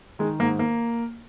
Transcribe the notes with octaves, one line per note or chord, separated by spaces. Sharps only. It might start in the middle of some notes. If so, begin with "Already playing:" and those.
D#3 G#3
G#2 A#3
A#3